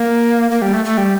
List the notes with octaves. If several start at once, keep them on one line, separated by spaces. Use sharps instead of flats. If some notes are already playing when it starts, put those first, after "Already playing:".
Already playing: A#3
A#3
G3
A3
A3
G3